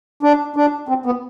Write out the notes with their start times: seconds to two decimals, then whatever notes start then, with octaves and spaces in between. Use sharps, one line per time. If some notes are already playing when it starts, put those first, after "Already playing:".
0.23 D4
0.56 D4
0.89 C4
1.06 B3